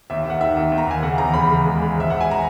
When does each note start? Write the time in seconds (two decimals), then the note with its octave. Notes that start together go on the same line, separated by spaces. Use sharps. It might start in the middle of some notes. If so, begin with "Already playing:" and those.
0.10 D#2 E5
0.25 D#2 F#5
0.41 D#3 E5
0.56 D#2
0.72 D#2
0.78 A#5
0.87 D#2 G#5
1.03 C#3 F#5
1.18 E2 A#5
1.34 C#3 B5
1.49 C#3
1.65 G#3
1.80 G#3
1.95 G#1 E5
2.10 G#1 F#5
2.21 G#5
2.31 A#5